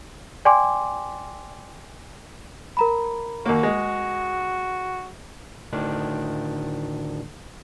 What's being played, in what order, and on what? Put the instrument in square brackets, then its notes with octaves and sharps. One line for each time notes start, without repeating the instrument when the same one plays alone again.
[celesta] D5 G5 G#5 C6 D6
A#4 A#5 B5
[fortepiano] D#2 A#3 [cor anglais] F#4
[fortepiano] G#3
[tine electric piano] D2 A2 D#3 D4